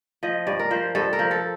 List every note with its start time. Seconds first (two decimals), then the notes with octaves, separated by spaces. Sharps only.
0.23 F3 D#5
0.47 G2 D5
0.59 A#4
0.71 F3 C5
0.95 G2 A4
1.13 A#4
1.19 F3
1.31 A4